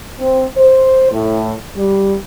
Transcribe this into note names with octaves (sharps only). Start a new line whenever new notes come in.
C4
C5
A2
G3